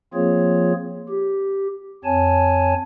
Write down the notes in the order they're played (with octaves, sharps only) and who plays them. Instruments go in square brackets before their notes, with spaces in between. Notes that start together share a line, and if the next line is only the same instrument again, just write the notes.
[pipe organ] F3 A#3 C4 F4 G#4 C#5
G4
F2 C4 C#5 G#5 A5